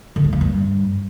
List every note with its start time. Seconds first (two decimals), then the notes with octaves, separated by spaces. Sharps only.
0.16 D3
0.24 A3
0.33 A#3
0.41 G2